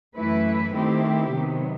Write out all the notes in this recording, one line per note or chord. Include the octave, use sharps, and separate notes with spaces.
F#2 E3 A3 E4 B4
D#3 A3 C4 E4 G4
C3 D#3 F#3 B3